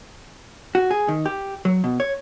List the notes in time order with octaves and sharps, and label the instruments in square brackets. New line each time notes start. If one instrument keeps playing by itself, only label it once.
[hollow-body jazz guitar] F#4
G#4
D#3
G4
F#3
B2
C#5